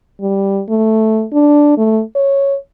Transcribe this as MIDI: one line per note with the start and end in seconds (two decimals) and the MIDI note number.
0.21 0.61 55
0.69 1.25 57
1.33 1.76 62
1.78 2.01 57
2.16 2.56 73